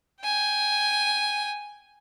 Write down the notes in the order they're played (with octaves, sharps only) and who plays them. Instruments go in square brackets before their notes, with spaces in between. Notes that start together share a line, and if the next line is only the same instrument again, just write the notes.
[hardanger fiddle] G5 G#5